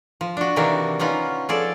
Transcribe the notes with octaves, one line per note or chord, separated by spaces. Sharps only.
F3
D4 F#4
C3 D#3 E3 A#3 D4 D#4
B3 C#4 D#4 F4
F3 G#4 A4 D5